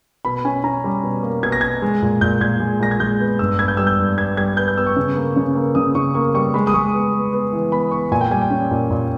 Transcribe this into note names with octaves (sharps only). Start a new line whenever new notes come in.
B2 B5
C#4 G#5
C#4 A#5
G3
B2
A#3
B2 G#6
A#6
B2 G#6
G#3
A#2
A#2 G6
A#2 G#6
G#3
A#2 A#6
G#6
G#3 G6
B3
G2 E6
B3 G#6
G6
G3 E6
G6
G2
B3 G#6
G3 G#6
B3 G6
G6
B3 E6
C#6
C#3
A#3
C#3
A#3
C#3 D#6
C#3 C#6
A#3 C#6
G3 C#6
G#3 B5
D#6
G#3 C#6
B3
B3
B3
E3
B3 B5
B3 C#6
A#2 G#5
G5
G3 G#5
G5
C#4
A#2
A#2